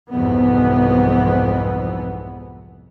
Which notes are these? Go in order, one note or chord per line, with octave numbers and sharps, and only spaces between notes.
C2 F2 G#2 E3 B3